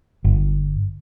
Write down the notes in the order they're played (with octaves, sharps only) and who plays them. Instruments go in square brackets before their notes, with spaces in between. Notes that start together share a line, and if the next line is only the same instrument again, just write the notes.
[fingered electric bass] G1